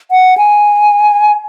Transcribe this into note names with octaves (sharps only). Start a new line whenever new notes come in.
F#5
G#5